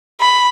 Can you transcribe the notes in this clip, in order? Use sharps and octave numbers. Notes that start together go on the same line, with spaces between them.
B5